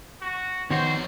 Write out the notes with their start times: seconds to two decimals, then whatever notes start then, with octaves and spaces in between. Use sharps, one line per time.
0.21 F#4
0.71 F2 D#3 B3 F#4 C5 C#5